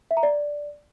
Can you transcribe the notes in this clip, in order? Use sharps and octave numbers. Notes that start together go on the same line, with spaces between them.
E5
A#5
D5